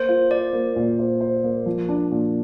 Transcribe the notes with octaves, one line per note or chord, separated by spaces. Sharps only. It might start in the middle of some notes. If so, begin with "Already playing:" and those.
Already playing: A#3 C5
F4
C5 D5
A#3
A#2
C5
C5
A#3
F3
D4
A#2